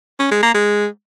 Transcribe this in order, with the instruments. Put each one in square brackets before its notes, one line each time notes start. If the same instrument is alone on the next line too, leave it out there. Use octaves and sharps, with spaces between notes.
[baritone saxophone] C#4
G#3
A#3
G#3